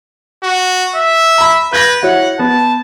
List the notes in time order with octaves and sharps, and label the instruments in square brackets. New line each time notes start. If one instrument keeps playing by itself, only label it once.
[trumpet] F#4
E5
[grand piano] A#5 B5
[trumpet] B4 [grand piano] G6 G#6 A#6
[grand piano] E4 F#4 C#5 [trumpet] F#5
[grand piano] B3 [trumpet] A5